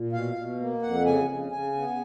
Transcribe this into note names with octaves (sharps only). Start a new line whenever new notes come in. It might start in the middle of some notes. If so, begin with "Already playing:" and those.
Already playing: A#2
B2 F5
B2
A#3
F2 F#5
C#3 G#5
C#3
C#3 G#5
B3